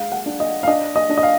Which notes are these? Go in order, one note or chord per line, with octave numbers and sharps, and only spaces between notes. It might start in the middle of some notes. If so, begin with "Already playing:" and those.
Already playing: G#3 D4 F5
F#5
D4
D#5
F5
D4 D#5
D#5
D4
D#5
F5